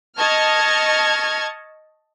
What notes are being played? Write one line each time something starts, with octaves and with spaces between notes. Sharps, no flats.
D#5 A5 C#6 F6 G#6